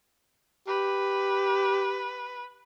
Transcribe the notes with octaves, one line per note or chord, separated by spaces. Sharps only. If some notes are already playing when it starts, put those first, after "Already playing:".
G4 B4